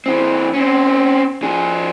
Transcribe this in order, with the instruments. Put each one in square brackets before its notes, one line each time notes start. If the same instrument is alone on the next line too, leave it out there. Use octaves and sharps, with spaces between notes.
[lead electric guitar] E3 C4
C4 C#4
F3 G#4